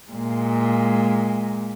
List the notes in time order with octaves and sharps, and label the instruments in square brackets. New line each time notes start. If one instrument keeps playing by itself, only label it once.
[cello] A#2 G#3